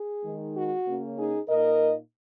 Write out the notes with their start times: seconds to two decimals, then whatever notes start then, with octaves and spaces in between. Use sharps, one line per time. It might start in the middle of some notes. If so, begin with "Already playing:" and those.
Already playing: G#4
0.23 D#3 G#3 D#4
0.55 F#4
0.86 C#3 A#3 C#4
1.18 D#4 G#4
1.49 A#2 A#3 D#4 A#4 D#5